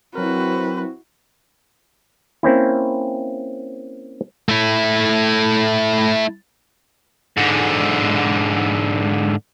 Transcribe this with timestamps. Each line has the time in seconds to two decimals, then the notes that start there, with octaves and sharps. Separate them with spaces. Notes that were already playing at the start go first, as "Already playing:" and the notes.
0.15 F#3 C4 E4 F#4 A#4 B4
2.43 A#3 C4 C#4 E4
4.49 A3 E4
7.37 G#2 D3